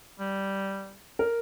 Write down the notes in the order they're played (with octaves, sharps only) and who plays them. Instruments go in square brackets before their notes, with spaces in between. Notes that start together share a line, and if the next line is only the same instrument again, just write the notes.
[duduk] G3
[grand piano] A#4